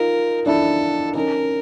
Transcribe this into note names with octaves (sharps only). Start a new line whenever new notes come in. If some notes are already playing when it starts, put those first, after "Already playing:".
Already playing: D#4 F4 A#4
D4 E4 A4
C#4 D#4 A#4